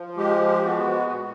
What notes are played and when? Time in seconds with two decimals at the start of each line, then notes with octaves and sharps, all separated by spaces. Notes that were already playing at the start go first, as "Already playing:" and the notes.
Already playing: F3
0.17 G#3 G4
0.65 B3 F#4
1.11 A#2